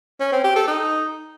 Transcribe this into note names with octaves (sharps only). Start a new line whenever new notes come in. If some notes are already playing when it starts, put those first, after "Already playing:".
C#4
C4
G4
A4
D#4